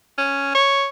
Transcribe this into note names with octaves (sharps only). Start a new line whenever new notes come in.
C#4
C#5